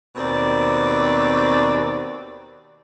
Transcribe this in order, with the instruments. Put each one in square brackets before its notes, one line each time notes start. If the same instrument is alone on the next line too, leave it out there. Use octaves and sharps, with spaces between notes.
[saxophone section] D#2 B2 C4 D5